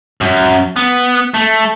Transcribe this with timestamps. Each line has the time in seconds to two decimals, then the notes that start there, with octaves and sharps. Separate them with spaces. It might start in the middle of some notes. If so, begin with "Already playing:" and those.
0.21 F#2
0.76 B3
1.34 A3